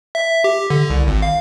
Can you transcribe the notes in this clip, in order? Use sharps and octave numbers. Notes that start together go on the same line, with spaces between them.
E5
G4
D3
C2
G#1
F5